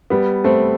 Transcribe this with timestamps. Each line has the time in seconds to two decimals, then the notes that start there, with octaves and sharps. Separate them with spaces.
0.10 G3 B3
0.44 A3 C4